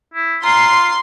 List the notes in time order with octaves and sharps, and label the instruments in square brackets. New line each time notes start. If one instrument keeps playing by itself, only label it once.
[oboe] E4
[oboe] F4 [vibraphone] A#5 [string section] C6